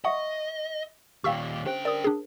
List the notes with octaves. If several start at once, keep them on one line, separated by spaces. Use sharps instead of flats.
D#5 E5 F#5 C#6 D#6
D#2 A#2 G4 F5 G5 C#6 E6 B6
D3 C#4 G4 C5 G5
A#4 D5 D#6
D4 G#4